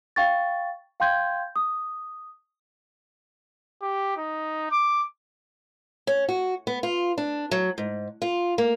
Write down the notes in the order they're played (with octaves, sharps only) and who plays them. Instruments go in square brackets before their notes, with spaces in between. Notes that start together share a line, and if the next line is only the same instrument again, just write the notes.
[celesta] F5 G5 C#6 A6
F5 G5 C6 G6 G#6
D#6
[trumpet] G4
D#4
D6
[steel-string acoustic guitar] C#4
F#4
B3
F4
D4
F#3
G#2
F4
A#3